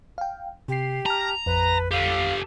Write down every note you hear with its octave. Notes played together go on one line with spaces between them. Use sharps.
F5 G5
C3 G4 C7
A5 A#5 F6
A1 F2 B4
G4 A4 F5